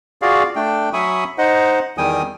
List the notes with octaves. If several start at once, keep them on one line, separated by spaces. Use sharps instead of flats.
F4 F#4 G#4 D5 F5
A3 D4 G5
F#3 E5 G#5 B5 C#6 D#6
D#4 C5 D#5 F#5
E2 D#3 G3 G5 G#5 D#6